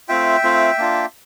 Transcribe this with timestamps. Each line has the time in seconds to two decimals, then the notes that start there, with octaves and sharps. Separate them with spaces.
0.09 A3 C4 F4 E5 G5
0.43 A3 C4 F4
0.78 A#3 D4 F4